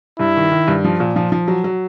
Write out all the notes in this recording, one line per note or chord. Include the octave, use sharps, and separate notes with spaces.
G2 E4
D#3
D#3
G2
F3
A#2
F3
F3
F#3
F#3